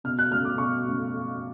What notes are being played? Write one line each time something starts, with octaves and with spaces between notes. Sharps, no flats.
B2 F6
F#6
A3 C#4 F6
D6
B2 C#6
A3 C#4